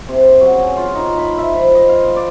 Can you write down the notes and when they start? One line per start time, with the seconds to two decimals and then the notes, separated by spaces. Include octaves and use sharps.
0.09 C3
0.41 F#3
0.53 C#3
0.77 F4
0.95 D#4
1.18 B5
1.38 E5
1.54 F3
1.75 D#5
1.89 F5
2.16 D5